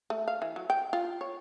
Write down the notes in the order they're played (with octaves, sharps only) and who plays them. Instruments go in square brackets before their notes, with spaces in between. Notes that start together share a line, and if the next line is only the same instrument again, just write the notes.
[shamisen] A3
F5
E3
F#3
G5
F4
C#5